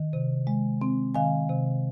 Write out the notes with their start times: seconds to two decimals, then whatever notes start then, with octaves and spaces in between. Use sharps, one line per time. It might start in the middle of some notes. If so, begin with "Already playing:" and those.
Already playing: D#3
0.13 C3
0.47 G#3
0.81 C4
1.14 D#3 F5 G#5
1.49 C3